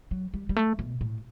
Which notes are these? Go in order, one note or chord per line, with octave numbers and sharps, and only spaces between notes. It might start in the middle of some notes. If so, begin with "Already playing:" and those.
F#3
G3
G3
A3
B2
A2